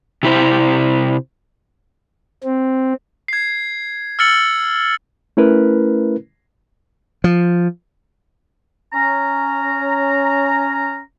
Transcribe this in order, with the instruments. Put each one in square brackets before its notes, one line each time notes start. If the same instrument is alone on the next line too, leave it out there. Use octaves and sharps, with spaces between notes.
[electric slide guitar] C3 E4 C5
[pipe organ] C4
[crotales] G#6 C7
E6 F6 A6 C#7 F#7
[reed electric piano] A3 C#4 E4 A#4 B4
[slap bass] F3
[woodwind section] C#4 A#5